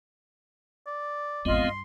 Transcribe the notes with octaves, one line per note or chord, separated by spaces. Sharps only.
D5
A1 F2 G#3 B3 C4 F4 D#5
G2 C6